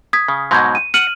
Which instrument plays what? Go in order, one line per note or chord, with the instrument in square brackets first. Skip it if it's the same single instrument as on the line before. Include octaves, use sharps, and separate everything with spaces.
[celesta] D#6 G#6 B6
[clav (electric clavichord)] C#3
[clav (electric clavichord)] G#2 B2 F#3 [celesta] C6 G6 G#6
[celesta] D#7
[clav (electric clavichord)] F#5 [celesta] F6 D#7 F#7